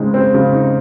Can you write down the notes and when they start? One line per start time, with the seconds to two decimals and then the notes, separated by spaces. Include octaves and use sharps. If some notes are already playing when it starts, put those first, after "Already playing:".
Already playing: C#3 G#3 C4 D#4
0.14 C4
0.34 C#3
0.54 D#4